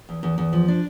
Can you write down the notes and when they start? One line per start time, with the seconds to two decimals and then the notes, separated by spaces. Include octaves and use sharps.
0.09 E2
0.23 E2
0.38 E2
0.53 F3
0.68 D4